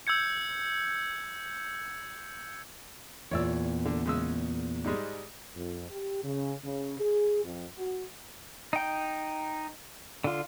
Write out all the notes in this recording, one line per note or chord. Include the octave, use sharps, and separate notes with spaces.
E6 G6 G#6 C#7
E2 A#2 C#5 D5 E6
D3
C#3 G#3 E6
G#2 G3 G#3
F2
G4
C#3
C#3
G#4
F2
F#4
D#4 G5
D3 F4